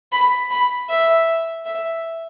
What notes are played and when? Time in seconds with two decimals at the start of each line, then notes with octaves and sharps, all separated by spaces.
0.12 B5
0.51 B5
0.89 E5
1.65 E5